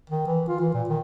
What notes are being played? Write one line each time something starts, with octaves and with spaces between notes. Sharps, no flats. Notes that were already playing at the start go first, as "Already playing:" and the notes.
D#3
E3
F4
E3
A#2
D#3